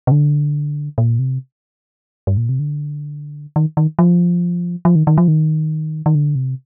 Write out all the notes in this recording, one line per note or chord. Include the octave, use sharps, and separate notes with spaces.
C3
D3
A#2
C3
G2
A#2
C3
D3
D#3
D#3
F3
F3
D#3
D#3
F3
D#3
D#3
D3
C3